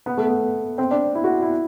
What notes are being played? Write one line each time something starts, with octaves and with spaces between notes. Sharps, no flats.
B3
A3
B3
C4
D4
E4
F#4
E4